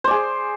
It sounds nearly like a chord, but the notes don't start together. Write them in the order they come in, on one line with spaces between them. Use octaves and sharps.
C5 D5 G#4